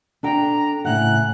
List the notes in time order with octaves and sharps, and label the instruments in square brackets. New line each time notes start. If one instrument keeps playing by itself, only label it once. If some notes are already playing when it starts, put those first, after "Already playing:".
[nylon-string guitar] D4 A4 G5 [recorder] A#5
[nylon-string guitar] A2 C#3 F#5 [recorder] F#6